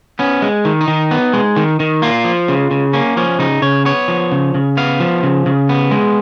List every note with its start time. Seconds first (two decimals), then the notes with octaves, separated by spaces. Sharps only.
0.19 B3 C#4
0.42 G#3
0.65 D#3
0.81 D#4
0.88 D#3
1.11 B3
1.33 G#3
1.56 D#3
1.80 D#3
2.02 A#3 F4
2.25 F3
2.48 C#3
2.71 C#3
2.93 A#3 C#4
3.17 F3 C#4
3.39 C#3 D#4
3.62 C#3 C#5
3.85 B3 C#5
4.08 F3
4.32 C#3
4.54 C#3
4.77 B3 F5
5.00 F3
5.23 C#3
5.46 C#3
5.69 B3
5.91 G#3